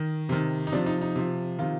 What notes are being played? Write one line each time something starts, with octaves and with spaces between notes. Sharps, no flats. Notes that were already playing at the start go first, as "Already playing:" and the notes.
Already playing: D#3
C3 D#3
D#4
C3 F3 D4
D#4
D#4
C3 F3
C3 D#3 F4